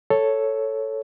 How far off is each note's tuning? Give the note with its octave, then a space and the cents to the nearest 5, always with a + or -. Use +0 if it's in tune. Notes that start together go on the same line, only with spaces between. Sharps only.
A4 +0 C#5 +0